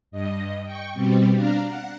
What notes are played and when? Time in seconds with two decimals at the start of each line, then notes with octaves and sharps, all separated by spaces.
0.11 G2 D#5
0.63 G5 C#6
0.94 B2 G3 C4
1.32 D4 F5 A#5
1.66 F#5